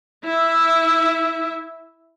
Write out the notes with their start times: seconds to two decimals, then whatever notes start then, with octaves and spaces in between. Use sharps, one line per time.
0.25 E4 E5